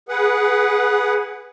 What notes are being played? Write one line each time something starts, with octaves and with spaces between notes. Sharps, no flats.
G#4 B4 F#5